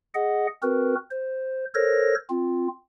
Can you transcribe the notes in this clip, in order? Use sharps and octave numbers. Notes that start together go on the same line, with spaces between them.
G#4 D#5 F#5
C4 F#4 A#4 B4
C5
A4 A#4 C5 C#5 A#6
C4 F4